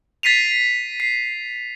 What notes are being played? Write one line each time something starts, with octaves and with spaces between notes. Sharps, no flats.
A6 B6 C7 D#7 F7
C7